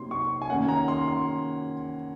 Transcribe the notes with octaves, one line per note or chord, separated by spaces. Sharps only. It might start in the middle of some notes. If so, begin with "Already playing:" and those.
Already playing: C3 F#3 A#3 D#4 C6
C#6
G#5
D#3 A#3 C#4 F#5
A#5
C6
C6